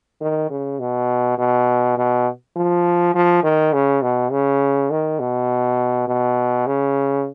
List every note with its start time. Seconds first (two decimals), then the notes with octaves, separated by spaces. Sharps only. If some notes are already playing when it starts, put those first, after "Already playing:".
0.21 D#3
0.50 C#3
0.80 B2
1.38 B2
1.97 B2
2.56 F3
3.15 F3
3.43 D#3
3.73 C#3
4.02 B2
4.32 C#3
4.91 D#3
5.20 B2
6.08 B2
6.67 C#3